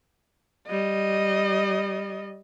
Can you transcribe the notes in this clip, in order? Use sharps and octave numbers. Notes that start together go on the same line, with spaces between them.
G3 D#5